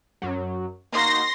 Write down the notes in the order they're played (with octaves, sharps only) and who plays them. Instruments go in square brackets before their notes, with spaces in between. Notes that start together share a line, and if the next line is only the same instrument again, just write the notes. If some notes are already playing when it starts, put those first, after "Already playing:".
[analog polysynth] F#2 F#3
[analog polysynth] A#3 D#4 F#4 [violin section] C6 A#6